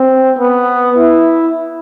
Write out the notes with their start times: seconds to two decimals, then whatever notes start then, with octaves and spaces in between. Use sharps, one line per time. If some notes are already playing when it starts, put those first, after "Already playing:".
Already playing: C4
0.39 B3
0.98 E4